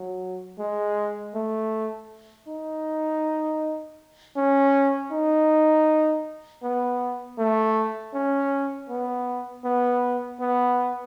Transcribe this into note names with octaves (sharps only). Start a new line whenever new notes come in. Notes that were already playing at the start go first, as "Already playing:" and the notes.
Already playing: F#3
G#3
A3
D#4
C#4
D#4
B3
A3
C#4
B3
B3
B3